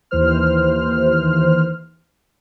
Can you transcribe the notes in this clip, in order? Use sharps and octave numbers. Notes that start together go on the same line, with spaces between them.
D#2 E3 C5 F6